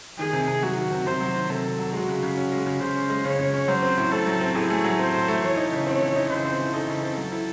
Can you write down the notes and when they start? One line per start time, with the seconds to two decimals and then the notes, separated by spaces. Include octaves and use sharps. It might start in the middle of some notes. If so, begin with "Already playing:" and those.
0.19 D#3 G#4
0.33 C3
0.48 C3
0.62 F#3 F#4
0.77 D#3
0.92 C3
1.06 C3 C5
1.21 F#3
1.35 D#3
1.50 C3 A4
1.64 C3
1.79 F#3
1.93 G#3 F#4
2.08 C#3
2.23 C#3
2.37 C#4
2.52 G#3
2.66 C#3
2.80 C#3 C5
2.95 C#4
3.10 G#3
3.25 C#3 C#5
3.39 C#3
3.53 C#4
3.68 F#3 C5
3.83 C4
3.97 A2
4.11 A3 A4
4.26 F#3
4.41 C4
4.55 A2 G#4
4.70 A3
4.84 F#3
4.99 C4 C5
5.14 A2
5.28 A3
5.43 E3 C#5
5.57 D#4
5.72 C#3
5.86 C4 C#5
6.01 E3
6.16 D#4
6.30 C#3 C5
6.45 C4
6.59 E3
6.74 D#4 A4
6.88 C#3
7.03 C4
7.17 F#3
7.32 E4